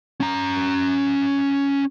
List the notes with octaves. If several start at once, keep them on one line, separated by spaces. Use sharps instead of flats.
C#4 A#5